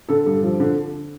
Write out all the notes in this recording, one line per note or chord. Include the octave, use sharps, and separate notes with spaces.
D3 A4
G2
F3
D3